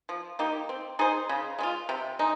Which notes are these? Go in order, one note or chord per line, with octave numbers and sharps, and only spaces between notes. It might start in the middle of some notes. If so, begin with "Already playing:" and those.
F3
A#3 D#4 G4
C4
D#4 G#4 C5
C#3
G#3 C#4 F4
C3
G#3 D#4